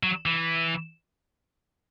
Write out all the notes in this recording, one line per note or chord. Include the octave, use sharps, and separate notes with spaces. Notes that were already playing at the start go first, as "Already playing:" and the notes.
F#3
E3